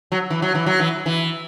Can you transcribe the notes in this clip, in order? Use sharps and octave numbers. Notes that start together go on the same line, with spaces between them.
F#3
E3
F#3
E3
F#3
E3
E3